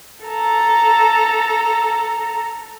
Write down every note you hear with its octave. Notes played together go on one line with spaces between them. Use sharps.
A4 A#5